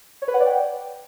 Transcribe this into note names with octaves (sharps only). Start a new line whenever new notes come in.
C#5
B4
F#5
D5
G5